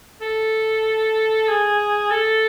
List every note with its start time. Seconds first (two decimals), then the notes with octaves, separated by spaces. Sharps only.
0.21 A4
1.49 G#4
2.11 A4